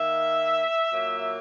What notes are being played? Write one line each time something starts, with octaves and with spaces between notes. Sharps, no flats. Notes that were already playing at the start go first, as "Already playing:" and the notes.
Already playing: D#3 A#3 E5
A#2 F#3 A#3